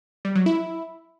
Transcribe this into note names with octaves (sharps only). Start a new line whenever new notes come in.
G3
F#3
E4